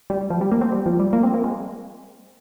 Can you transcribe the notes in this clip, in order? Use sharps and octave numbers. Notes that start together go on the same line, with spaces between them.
G3
F3
G3
A#3
C4
G3
F3
G3
A#3
C4
A#3
G#3